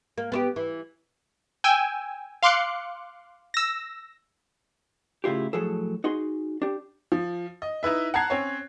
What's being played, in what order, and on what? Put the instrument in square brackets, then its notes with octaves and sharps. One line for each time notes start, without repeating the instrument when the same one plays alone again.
[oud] A#3
B3 C4 G4
E3
[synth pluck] G5 G#5 E6
F5 C6 D6 F#6 C#7
E6 A#6
[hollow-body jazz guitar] A2 C#3 E4 F4 G4
A2 F3 F#3 G#4 A4
D#4 F#4 G#4 C6
D4 G4
[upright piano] F3
D#5
D#4 E4 B4 E5
F#5 A5 A#5 F#6 G#6 C7
C4 C#4 C#5